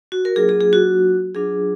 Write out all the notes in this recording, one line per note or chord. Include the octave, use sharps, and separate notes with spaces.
F#4
A#4
F#3 A#3 D4 F4 G#4
G#4
G#4
F#4
F#3 D4 F4 G#4